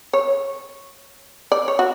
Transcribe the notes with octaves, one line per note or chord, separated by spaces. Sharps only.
C#5
D5
C#5
F#4